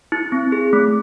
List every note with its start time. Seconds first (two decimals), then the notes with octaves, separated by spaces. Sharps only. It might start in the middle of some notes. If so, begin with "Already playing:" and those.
0.12 E4
0.32 C4
0.52 G#4
0.73 A3